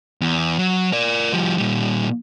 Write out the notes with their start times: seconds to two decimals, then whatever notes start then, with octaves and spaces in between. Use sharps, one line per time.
0.21 E2
0.59 F#3
0.93 A#4 D5
1.33 F3 G3
1.58 A#2 G3